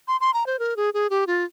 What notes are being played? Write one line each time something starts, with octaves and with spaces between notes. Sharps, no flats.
C6
C6
A#5
C5
A#4
G#4
G#4
G4
F4